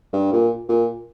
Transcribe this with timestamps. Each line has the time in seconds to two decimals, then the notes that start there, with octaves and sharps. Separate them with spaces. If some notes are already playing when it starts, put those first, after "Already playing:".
0.13 G2
0.33 A#2
0.69 A#2